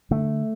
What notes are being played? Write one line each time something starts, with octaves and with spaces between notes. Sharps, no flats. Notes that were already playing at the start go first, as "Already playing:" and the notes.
D3 A3